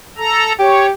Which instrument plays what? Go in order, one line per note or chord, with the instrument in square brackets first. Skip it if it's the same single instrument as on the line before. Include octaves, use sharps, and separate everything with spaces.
[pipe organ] A4 A#5
[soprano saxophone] G4 [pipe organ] C#5